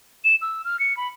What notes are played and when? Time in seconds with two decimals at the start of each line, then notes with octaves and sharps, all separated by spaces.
0.24 E7
0.42 E6
0.65 F6
0.80 C#7
0.97 B5